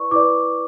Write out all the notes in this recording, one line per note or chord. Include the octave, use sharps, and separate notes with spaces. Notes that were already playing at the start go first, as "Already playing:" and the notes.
Already playing: E4 B4 D5 C#6
E4 B4 D5 D6